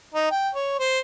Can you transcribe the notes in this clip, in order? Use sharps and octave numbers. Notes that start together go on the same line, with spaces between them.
D#4
G5
C#5
C5